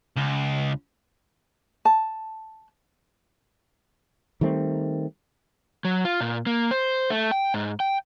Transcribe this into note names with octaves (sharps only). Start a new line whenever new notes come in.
C#2
A5
D#3 G3 A3 C4
F#3
F4
A#2
A#3
C5
A3
G5
G#2
G5